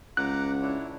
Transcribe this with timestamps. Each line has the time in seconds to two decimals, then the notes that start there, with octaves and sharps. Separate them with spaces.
0.17 C#2 F#5 A#5 D6 F#6
0.62 D4 E4 C#5